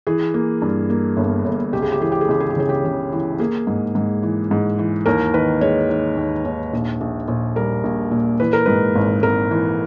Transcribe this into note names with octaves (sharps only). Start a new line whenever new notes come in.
E3 G#4
A#3
G2
A#3
G1
G1
C#2 G4
G#4
G4
E3 G#4
G4
G#4
C#2 G4
G#4
G4
C#3 G#4
G4
C#3
E3
A#3 G#4
G#2
G#2
E3
G#2
E3
D#2 A#4
D#3 B4
G#3 C#5
D#3
D#2
D#2
A#1
A#1
A#1
G3 A#4
A#1
A#2
E3 B4
A#4
G#2 B4
G#1
G#1 A#4
E3